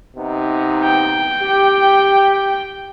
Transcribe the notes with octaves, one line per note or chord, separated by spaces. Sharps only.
C3 B3 D#4
G5
G4